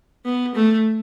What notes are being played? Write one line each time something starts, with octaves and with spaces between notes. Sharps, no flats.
B3
A3